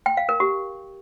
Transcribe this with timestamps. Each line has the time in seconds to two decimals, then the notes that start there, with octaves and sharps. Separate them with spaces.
0.06 G5
0.17 F5
0.29 A#4
0.40 G4